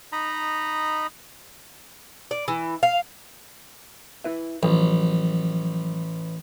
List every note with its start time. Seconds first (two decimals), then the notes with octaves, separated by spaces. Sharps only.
0.12 D#4 D#5 A#5 B5
2.31 D5
2.48 E3
2.83 F5
4.24 E4 B4 E5
4.63 A1 F3 F#3